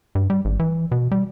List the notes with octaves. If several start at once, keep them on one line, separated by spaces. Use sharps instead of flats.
G2
G3
G#1
E3
B2
G3